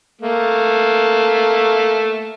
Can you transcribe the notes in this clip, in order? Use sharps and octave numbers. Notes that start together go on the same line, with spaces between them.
A3 A#3